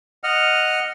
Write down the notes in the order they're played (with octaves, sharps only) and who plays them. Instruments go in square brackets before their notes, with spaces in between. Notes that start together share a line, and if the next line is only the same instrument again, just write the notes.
[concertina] D#5 F#5 F6